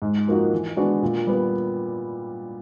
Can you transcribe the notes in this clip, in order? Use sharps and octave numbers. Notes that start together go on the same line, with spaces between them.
G#2
F3 A#3 D#4 F#4
E3
G#3 B3 D4 F#4
A#2
G3 B3